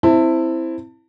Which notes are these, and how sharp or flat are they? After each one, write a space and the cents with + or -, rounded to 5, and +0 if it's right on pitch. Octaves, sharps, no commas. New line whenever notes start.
C4 +0 E4 +0 A5 +30